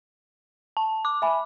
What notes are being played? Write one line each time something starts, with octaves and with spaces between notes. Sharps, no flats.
A5
D6
E5 G#5 B5